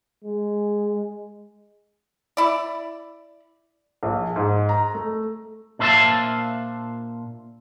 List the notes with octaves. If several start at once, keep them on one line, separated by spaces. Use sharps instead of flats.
G#3
E4 D5
A#1
G#2
A#5
A3
A#2 D4 C5 E5 F5 A5